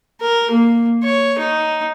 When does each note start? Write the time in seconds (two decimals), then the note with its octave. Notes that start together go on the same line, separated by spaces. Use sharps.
0.21 A#4
0.51 A#3
1.04 C#5
1.39 D#4